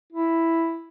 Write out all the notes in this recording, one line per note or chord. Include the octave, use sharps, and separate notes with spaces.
E4